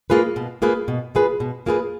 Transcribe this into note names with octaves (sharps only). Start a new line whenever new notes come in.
A#3 F4 G#4 B4
B2
A#3 F4 G#4 B4
B2
A#3 F4 G#4 B4
B2
A#3 F4 G#4 B4